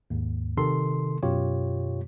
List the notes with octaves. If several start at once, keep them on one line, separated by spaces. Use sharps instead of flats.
D#2 G#2
C3 D#3 A4 C6
F#2 B2 F4 G4 C#5